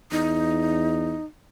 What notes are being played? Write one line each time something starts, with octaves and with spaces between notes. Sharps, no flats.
E2 D#4